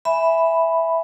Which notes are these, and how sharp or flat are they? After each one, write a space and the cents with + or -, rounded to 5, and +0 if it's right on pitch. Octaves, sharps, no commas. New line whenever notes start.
E5 +0 G#5 +0 B5 +0